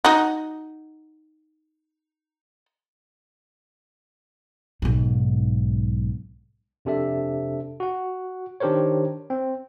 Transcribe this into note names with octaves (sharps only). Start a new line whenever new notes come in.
D#4 F#4
B1 G#2
F2 C3 D4 A4 E5
F#4 F#5
D#3 D4 G4 A#4 C5 C#5
C4